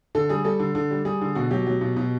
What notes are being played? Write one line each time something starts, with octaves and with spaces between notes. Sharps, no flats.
D3 A4
G3 G#4
G3 A4
D3
D3
G3
G3 G#4
D3
B2 F#4
F#3 G4
F#3
B2
B2